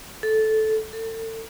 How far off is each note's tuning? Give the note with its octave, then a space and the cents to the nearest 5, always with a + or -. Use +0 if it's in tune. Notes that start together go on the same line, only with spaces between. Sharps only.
A4 -10
A4 +35